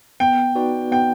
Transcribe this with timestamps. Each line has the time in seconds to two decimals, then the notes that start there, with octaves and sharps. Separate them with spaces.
0.20 B3 G5
0.55 D#4 F#4 B4 D5
0.91 B3 G5